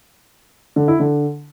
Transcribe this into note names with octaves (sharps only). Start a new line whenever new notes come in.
D3
E4
D3